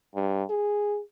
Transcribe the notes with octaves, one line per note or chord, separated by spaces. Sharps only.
G2
G#4